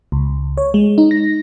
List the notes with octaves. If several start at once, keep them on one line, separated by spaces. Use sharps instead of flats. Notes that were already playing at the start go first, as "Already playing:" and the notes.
C#2
C#5
G#3
D#4
A#6